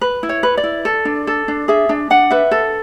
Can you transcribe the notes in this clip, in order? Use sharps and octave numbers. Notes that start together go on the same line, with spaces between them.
B4
E4
C#5
B4
D5
E4
A4
D4
A4
D4
G#4 E5
D4
D4 F#5
B4 E5
A4